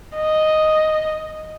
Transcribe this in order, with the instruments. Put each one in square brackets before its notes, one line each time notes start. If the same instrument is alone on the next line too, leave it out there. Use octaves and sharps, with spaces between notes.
[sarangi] D#5